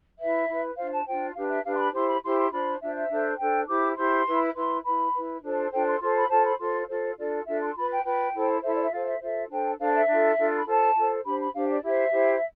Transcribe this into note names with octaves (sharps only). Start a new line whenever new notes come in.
E4 B4 E5
E4 B4
D4 F4 C5 F5
A5
D4 F4 C5 G5
D4 G4 B4 F5
E5
D4 G4 B4 F5
C6
B5
E4 G4 C5 C6
B5
E4 G4 C5 C6
C6
D4 F4 C5 B5
D4 F4 C5 E5
E5
D4 A4 C5
D4 A4 C5 G5
E4 G4 C5 D6
E4 G4 C5 C6
E4 B4
E4 B4 C6
E4 B4 B5
E4 B4
D4 F4 A4 C5
D4 F4 A4 C5 G5
C6
F4 A4 C5 C6
B5
F4 A4 C5 A5
B5
F4 A4 C5 C6
F4 A4 C5
D4 F4 A4 D5
D4 F4 A4 E5
C6
F4 B4 B5
G5
F4 B4 G5
E4 A4 C5
E4 A4 C5 E5
D5
E5
F4 A4 C5 F5
E5
F4 A4 C5 E5
D4 A4 C5 G5
D4 A4 C5 F5
E5
D4 F4 A4
D4 F4 A4
B5
F4 A4 C5 A5
F4 A4 C5
D4 G4 C5 B5
B5
D4 G4 C5 F5
D5
E4 G4 C5 E5
E4 G4 C5